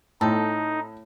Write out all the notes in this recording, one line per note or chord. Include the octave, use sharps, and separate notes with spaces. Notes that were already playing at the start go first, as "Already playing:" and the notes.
A2 C4 D#4 A4